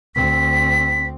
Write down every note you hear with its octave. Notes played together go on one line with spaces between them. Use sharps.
D2 C4 B6